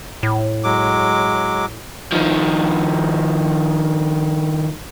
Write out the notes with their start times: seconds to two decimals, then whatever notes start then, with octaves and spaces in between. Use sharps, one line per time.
0.23 A2
0.64 F#3 G#3 D6
2.12 D#3 F3